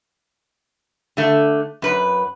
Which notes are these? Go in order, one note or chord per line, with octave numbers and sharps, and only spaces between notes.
D3 A3
F#2 B4